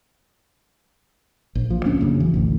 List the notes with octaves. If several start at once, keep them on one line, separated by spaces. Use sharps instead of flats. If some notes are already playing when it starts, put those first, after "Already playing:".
A#1
F3
D2 A#3 C#4 D4
F#2 C#3
F1 E3
A1 D2